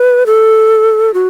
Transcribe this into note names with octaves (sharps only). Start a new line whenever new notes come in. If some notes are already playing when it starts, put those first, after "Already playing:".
Already playing: B4
A4
F#4